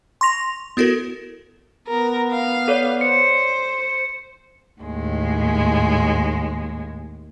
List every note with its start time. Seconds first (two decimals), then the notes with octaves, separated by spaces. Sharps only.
0.21 C6 C#6 A#6 F7
0.33 F7
0.77 B3 E4 F#4 A4 A#4
1.87 B3 A#4
2.32 F5
2.68 A4 C#5 D5
3.01 C5 C#7
4.81 D#2 A2 G#3